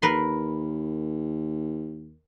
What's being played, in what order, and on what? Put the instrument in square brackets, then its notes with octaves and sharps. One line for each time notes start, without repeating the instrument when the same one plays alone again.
[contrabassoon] D#2 [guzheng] A#4 B4 C6